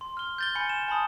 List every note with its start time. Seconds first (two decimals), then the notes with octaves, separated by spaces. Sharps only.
0.01 C6
0.17 F6 G7
0.38 G6 A6 G7
0.55 G#5 B5 A6 C#7
0.69 E7
0.88 G#5 A5 B5 D#6